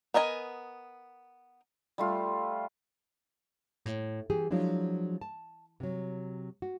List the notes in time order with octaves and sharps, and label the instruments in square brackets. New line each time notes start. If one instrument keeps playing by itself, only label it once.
[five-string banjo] B3 A#4 D#5 G#5
[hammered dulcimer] G3 A3 F4
[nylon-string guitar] A2
E3 G4 G#4
F3 F#3 G#3 D4 E4
A5
C3 F#3
F#4